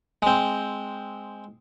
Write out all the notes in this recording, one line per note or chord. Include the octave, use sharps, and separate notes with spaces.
G#3 C4